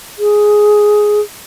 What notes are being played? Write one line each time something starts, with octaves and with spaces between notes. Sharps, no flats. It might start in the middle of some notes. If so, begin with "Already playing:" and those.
G#4